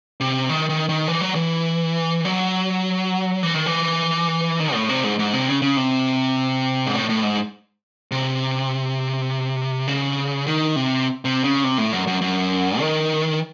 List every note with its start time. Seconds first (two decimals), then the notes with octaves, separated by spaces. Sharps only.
0.20 C3
0.49 D#3
0.69 D#3
0.89 D#3
1.08 E3
1.21 F#3
1.35 E3
2.25 F#3
3.43 E3
3.54 D#3
3.66 E3
4.60 D#3
4.74 A2
4.89 C3
5.04 G#2
5.19 G#2
5.33 C3
5.48 C#3
5.62 C#3
5.77 C3
6.87 G#2
6.95 A2
7.09 A2
7.23 G#2
8.11 C3
9.87 C#3
10.46 D#3
10.76 C3
11.25 C3
11.44 C#3
11.64 C3
11.78 A2
11.93 F#2
12.07 F#2
12.21 F#2
12.80 D#3